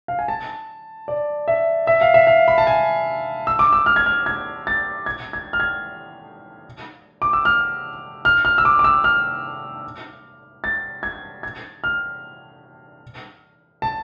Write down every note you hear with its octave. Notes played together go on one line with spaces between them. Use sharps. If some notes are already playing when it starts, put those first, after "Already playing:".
F5
G#5
A5
D5
E5
E5
F5
E5
F5
B5
A5
G#5
E6
D6
E6
F6
G#6
F6
G#6
A6
G#6
G#6
F6
G#6
D6
E6
F6
F6
F6
E6
D6
D6
E6
F6
A6
G#6
G#6
F6
A5